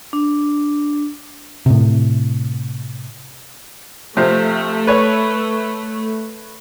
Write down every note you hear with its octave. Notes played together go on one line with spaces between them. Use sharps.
D4
A2 C3
C3 F3 A3
B4 C#5